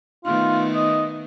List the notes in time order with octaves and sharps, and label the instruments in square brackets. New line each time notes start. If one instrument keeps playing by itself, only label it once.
[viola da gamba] D#3 A3 B3 [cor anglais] F4
[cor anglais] D#5